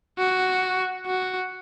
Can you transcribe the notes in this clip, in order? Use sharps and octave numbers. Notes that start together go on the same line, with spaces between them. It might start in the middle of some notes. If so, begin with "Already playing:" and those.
F#4
F#4